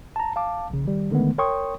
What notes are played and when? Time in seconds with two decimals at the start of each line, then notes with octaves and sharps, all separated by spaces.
0.16 A5 A#5
0.36 F5 A5 D6
0.70 A#1 C#3
0.85 D#3 G3
1.11 D3 D#3 G#3 A3 B3
1.38 A#4 C#5 G5 C6 C#6 D#6